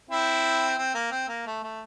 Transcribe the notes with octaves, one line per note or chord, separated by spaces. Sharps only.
C4 E4
C4
A#3
C4
A#3
A3
A3